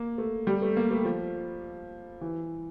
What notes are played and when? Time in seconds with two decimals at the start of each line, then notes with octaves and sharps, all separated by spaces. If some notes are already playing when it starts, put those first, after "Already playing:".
Already playing: A#3
0.18 A3
0.47 G3
0.62 A3
0.77 A#3
0.91 A3
1.05 F3
2.21 E3